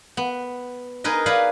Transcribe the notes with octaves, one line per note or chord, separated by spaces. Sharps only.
B3
D#4 G#4 A#4 B4 D#5
B4 D5 F5 G#5 A#5 B5